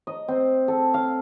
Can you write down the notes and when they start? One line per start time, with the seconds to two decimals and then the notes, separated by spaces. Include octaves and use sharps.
0.07 D#5
0.28 C4
0.68 A4
0.94 F5